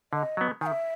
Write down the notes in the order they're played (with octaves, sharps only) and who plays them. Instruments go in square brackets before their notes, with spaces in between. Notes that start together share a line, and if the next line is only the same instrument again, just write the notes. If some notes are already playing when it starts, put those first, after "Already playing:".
[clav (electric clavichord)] D3 [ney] D#5
[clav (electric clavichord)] F#3 B3
[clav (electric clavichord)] D#3 [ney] G#5
[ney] E5